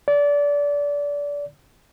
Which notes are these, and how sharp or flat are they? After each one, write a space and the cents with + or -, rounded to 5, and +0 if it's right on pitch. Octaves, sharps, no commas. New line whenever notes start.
D5 -25